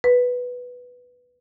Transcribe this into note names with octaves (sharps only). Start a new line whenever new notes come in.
B4